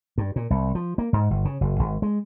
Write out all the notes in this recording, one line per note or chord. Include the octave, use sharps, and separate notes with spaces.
G2
A#2
C2
F3
A#3
G#2
G1
C#3
F#1
G#1
G#3